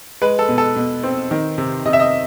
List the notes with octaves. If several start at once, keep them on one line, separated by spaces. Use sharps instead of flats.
G#3 B4
A4
B2
A4
B2
C4
D#3
C3
C3 D#5
E5
D#5